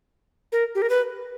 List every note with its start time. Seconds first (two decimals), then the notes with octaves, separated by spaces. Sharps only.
0.52 A#4
0.75 G4
0.82 A#4
0.90 B4